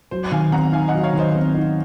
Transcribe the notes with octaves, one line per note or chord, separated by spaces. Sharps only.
F#3 C5
D#3 F5 G#5
C4 F#5 A#5
D#4 F5 G#5
D#5 F#5
F#3
C#5 F5
D#3
C5 D#5
C4
D#4